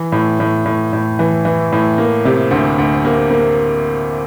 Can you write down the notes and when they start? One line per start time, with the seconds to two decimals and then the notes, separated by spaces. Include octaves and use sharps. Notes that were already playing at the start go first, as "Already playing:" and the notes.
Already playing: E3
0.12 A2
0.40 A2
0.65 A2
0.93 A2
1.19 E3
1.45 E3
1.72 A2
1.98 A#3
2.25 C3
2.51 D2
2.78 D2
3.05 A#3
3.31 A#3